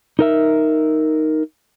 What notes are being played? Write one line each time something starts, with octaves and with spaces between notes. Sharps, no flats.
D#4 A#4 E5